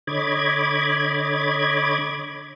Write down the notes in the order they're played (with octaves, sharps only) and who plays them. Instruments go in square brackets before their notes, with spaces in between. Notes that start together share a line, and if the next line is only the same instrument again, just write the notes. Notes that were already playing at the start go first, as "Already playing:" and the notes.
[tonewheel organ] D3 C#5 D#5 B5 D6 G#6